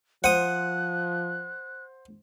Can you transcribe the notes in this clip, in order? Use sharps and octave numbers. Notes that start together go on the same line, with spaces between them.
F3 C5 F#5 D#6 F#6